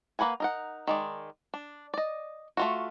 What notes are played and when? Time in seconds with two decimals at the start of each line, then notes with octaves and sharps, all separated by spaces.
0.19 A#3 B4 F#5 G#5
0.40 D#4 A#4 F#5
0.87 D#3 G#3 D5
1.54 D4
1.94 D5 D#5
2.57 A3 F4 F#4